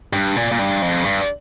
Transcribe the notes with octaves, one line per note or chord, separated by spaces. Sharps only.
G2
A#2
A#2
G2
F2
G2